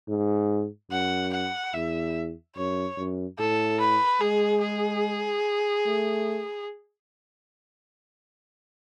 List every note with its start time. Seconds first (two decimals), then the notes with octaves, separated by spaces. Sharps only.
0.09 G#2
0.91 F#2 F#5
1.33 F#5
1.74 E2 E5
2.56 F#2 C#5
2.98 F#2
3.39 A2 A4
3.80 B4
4.21 G#3 G#4
4.62 G#4
5.86 A3